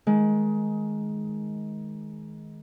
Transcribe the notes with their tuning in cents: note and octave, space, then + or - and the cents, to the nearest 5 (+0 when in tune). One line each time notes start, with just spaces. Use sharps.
D#3 +20 G#3 +20